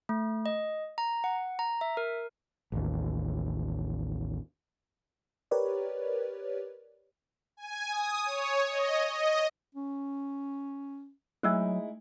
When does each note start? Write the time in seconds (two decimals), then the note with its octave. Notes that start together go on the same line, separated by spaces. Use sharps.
0.09 A3
0.46 D#5
0.98 A#5
1.24 F#5
1.59 A#5
1.81 E5
1.97 A#4
2.72 A1 D#2
5.51 G4 A#4 B4 C#5 D5
7.57 G#5
7.90 D#6
8.25 C#5
8.71 D#5
9.12 D#5
9.75 C#4
11.43 F#3 G#3 A3 D#4 E4 E6 F#6